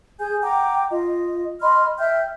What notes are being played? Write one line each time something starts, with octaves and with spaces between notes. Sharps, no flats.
G#4 G#5 G6
F#5 G5 A#5 D6
F4 D#5
D#5 B5 C6 F6
E5 G5 F6 G6